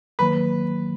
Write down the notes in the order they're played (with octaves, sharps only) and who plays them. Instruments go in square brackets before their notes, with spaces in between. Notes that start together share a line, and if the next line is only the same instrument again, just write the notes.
[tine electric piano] D#3 F#3 A#3 [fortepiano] B4